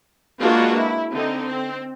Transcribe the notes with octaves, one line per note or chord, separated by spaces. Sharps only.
G#3 A#3 D4 F4 F#4 B4
E4
D3 C4 D#4
C4